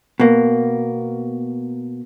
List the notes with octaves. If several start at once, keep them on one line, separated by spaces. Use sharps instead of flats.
B2 A#3